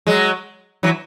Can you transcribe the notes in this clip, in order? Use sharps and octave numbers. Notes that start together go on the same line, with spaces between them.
F#3 G#3
E3 F#3